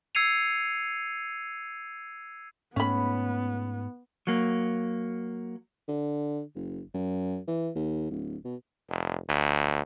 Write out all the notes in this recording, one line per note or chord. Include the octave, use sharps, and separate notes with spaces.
E6 G#6 C7 C#7 D#7 F7
G#2 A3 B3 C#4 B5
F#3 A#3
D3
F#1
F#2
E3
D#2
D1
B2
F1
D2